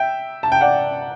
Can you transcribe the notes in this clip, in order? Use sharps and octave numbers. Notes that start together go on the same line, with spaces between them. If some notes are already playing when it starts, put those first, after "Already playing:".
Already playing: E5 G5
A5
G5
D5 F#5